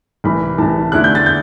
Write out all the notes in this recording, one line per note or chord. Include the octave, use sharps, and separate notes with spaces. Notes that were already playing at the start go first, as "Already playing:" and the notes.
C2 C3 E3 B5
C2 C3 E3 A5
E2 D3 A3 E4 F#6
G6
A6
G6